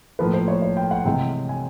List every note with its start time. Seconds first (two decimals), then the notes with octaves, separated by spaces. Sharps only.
0.19 A2 F3 A#3 B4
0.34 C5
0.48 C#5
0.62 C#5
0.77 G5
0.91 F#5
1.05 C3 E3 G#3 G5
1.49 G#5